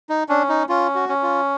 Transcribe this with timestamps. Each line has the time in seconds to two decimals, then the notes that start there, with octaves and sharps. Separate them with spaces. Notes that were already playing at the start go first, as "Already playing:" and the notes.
0.10 D#4
0.29 C#4 D4
0.49 D#4
0.69 C#4 F4
0.95 F#4
1.09 C#4
1.22 F4